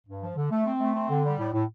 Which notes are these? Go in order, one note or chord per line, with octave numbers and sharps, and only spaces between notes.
G2
F3
D3
A3
C4
A3
C4
D3
G3
A2
A2